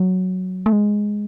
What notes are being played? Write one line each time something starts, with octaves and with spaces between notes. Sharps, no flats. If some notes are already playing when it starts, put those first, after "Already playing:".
Already playing: F#3
A3
G#3